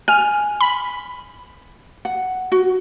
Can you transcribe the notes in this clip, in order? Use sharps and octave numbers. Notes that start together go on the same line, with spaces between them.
G#5 F6
B5
F#5
F#4